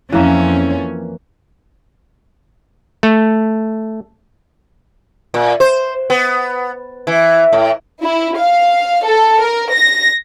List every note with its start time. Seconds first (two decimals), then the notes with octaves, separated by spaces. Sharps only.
0.12 F2 E3 A#3 C#4 E5
3.03 A3
5.34 A#2
5.60 C5
6.10 B3
7.07 E3
7.53 A2
8.03 E4
8.37 F5
9.05 A4
9.42 A#4
9.72 A#6